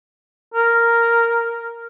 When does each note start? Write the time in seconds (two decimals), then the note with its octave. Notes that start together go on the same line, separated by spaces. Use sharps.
0.54 A#4